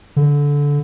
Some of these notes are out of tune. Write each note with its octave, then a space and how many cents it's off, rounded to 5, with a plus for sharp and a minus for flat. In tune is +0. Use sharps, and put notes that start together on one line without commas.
D3 -20